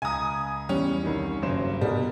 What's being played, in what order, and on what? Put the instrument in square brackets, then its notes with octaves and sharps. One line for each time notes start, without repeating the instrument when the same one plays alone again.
[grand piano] C#2 A#5 [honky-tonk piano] G#5 D#6
[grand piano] E2 [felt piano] G3 [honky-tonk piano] C#4
[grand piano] C2 D#3
[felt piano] F#1 E7 [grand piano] G2 F#3 C5
[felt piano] B2 B3 [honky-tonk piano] G3 [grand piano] A#4